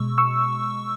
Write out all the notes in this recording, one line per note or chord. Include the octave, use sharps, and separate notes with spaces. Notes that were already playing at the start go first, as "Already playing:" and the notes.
Already playing: B2 G#3 C#6 E6
C#6 E6